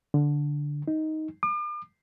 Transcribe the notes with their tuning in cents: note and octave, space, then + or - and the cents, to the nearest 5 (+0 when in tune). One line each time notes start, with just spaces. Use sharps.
D3 -5
D#4 +10
D6 +40